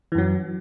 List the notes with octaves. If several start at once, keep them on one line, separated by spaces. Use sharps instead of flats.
F#2 E3 F#3